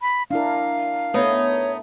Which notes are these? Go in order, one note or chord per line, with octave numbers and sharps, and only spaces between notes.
B5
D4 E4 A#4 F5
A3 B3 D#4 C#5